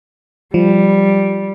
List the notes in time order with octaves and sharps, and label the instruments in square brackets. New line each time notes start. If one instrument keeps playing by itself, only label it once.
[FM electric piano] F3 [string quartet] G3